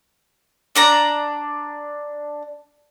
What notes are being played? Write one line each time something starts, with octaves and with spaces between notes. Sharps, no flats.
D4 D5 A#5